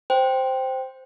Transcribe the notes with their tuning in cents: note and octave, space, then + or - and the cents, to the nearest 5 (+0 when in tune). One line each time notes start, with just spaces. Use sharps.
C5 +0 G5 +0